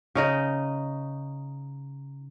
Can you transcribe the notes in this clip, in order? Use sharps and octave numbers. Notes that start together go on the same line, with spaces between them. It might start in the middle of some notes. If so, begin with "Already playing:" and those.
C#3 D#4 D#5